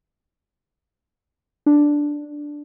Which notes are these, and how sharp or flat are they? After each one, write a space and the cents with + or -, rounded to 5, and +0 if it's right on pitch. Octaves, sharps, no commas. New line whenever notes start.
D4 -5